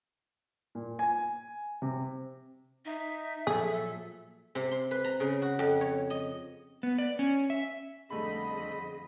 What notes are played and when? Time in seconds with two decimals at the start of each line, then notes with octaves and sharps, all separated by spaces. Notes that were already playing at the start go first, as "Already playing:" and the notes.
0.75 A#2
0.99 G#5
1.82 C3
2.85 D#4 E5
3.47 A#2 F3 F#3 G#4 A4
4.55 C3
4.71 C6
4.91 B4
5.04 A#5
5.20 C#3
5.42 F#4
5.59 F2
5.81 C#5
6.10 D#5
6.83 B3
6.98 D5
7.19 C#4
7.50 E5
8.10 F2 D3 G3 A3 D#4 G#4 D#5 B5